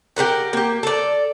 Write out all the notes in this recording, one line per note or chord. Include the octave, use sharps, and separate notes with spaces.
G4 G#4 A#4 F#5
A#3 G4
A4 D5